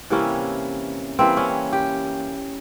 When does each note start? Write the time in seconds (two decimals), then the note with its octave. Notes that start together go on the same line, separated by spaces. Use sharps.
0.10 C3 E3 G3 A#3 C#4
1.19 E3 G3 A#3 C4
1.37 C#4
1.73 G4